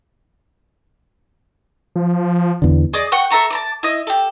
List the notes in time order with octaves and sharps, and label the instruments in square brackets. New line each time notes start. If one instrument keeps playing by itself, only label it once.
[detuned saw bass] F3
[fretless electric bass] E2 D3
[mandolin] G#4 D5 D#5 D6
F#5 G5 C#6 F#6
A4 E5 A#5 C#6
A5 B5 D6
E4 D#5
G4 A4